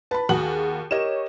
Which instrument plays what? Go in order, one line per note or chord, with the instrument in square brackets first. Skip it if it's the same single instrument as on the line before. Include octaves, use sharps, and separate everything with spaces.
[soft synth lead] B4 [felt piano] A5 B5
[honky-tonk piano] D#2 F#4 F#7 [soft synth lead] G#4
[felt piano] G4 A#4 D#5 [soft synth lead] C#5 [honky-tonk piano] E7